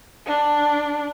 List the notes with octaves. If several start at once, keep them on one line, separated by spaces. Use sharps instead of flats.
D4